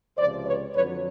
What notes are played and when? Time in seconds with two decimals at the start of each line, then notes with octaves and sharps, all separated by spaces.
0.17 C#2 C3 F3 C5 D5
0.45 B4 C#5
0.74 F2 D3 F#3 B4 C#5